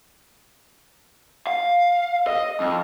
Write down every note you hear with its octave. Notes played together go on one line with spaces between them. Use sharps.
F5
D#5
F2